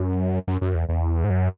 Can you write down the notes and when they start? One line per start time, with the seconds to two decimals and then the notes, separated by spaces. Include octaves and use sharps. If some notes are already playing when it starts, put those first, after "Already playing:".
Already playing: F#2
0.48 F#2
0.61 F#2
0.75 E2
0.89 E2
1.24 G#2
1.30 F#2